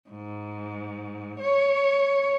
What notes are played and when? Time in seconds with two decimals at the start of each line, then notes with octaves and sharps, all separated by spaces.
0.10 G#2
1.38 C#5